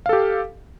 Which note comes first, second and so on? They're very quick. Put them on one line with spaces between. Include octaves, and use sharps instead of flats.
F5 A4 G4